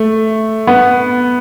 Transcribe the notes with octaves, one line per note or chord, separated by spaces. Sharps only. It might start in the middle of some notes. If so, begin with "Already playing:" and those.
Already playing: A3
B3